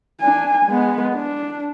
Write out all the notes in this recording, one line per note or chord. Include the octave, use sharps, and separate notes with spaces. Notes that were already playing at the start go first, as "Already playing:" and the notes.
D4 G#5
G#3 B3
D4